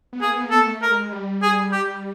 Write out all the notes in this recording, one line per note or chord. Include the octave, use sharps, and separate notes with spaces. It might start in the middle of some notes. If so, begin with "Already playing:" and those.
B3
A#3 G#4
B3
A#3
B3 A4
A#3
A3
A#4
G#3
G3
G#4
G4